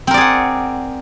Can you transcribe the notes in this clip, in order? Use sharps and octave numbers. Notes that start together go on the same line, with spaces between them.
C4 G#4 A#4 D5 F#5